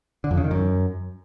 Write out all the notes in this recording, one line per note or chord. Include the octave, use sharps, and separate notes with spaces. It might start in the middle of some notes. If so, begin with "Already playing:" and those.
D3
F2
C#3
D#3
F#2